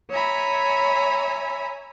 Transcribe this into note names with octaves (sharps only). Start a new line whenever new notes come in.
C#5 E5 G#5 A#5 B5